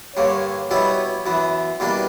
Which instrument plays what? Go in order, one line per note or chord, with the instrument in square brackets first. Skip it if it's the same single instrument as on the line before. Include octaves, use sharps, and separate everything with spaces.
[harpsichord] G2 D3 A#3 [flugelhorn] C#5
[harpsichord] B2 G3 B3 E4 B4 [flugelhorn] C#5
[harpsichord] F#2 E3 B3
E2 B2 G3 A#3 D4